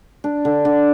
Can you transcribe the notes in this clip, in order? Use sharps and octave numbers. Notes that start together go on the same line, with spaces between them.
D4
D3
D3